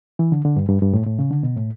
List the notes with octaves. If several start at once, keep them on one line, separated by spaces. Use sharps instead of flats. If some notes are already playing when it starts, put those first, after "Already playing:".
E3
D3
D3
G2
G2
G2
A2
A2
C#3
D3
B2
A2